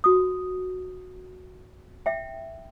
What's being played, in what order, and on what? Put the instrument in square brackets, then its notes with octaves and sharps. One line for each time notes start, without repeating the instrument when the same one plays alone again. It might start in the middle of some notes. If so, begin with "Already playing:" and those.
[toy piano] F#4 D#6
E5 G5